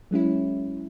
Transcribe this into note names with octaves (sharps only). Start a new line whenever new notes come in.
F#3 G#3 C#4 E4